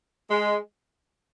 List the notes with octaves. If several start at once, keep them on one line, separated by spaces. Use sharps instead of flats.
G#3